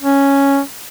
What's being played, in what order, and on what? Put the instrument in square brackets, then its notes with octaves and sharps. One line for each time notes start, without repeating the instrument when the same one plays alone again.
[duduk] C#4